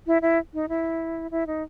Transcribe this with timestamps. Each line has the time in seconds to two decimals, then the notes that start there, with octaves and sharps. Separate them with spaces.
0.07 E4
0.22 E4
0.54 D#4
0.69 E4
1.31 E4
1.47 D#4